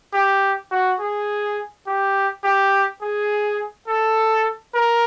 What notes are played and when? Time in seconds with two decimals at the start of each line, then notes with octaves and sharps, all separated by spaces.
0.14 G4
0.72 F#4
1.00 G#4
1.87 G4
2.44 G4
3.02 G#4
3.88 A4
4.74 A#4